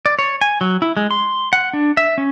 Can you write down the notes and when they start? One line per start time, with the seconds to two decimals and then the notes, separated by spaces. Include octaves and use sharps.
0.06 D5
0.19 C#5
0.41 G#5
0.61 F#3
0.82 E4
0.97 G#3
1.11 C6
1.53 F#5
1.73 D4
1.97 E5
2.18 C#4